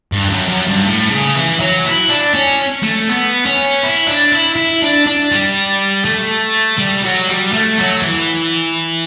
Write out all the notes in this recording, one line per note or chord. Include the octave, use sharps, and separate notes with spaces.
G2
F#2
F#2
G2
A2
C#3
E3
F#3
E4
D4
C#4
A3
B3
C#4
E4
D4
E4
E4
D4
D4
G3
A3
G3
F#3
G3
A3
F#3
E3